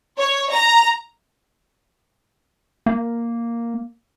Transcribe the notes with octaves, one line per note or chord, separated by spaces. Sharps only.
C#5
A#5
A#3